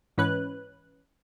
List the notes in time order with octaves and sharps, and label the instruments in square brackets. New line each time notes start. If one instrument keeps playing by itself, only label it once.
[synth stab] G#2 E3 C#4 B4 F#6